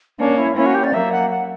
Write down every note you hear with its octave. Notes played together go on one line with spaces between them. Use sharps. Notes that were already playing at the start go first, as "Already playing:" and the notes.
A#3 C#4 D4
E4
A#3 C#4 E4
F#4
G4
D5
F#3 A#3 E5
F#5
F#5